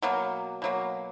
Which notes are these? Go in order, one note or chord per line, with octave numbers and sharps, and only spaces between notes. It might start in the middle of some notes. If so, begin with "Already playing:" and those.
B2 F#3 A#3
B2 F#3 A#3